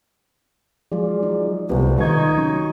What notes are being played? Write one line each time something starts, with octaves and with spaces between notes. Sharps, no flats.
F3 F#3 G#3 F4 G#4 D5
D#4
C2 A3 B3 F4 G4 B4
D#3 D#4 D#5 C#6 G#6
F#3 C#4 C#6